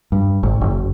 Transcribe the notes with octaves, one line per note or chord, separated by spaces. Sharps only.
G2
G#1
F#1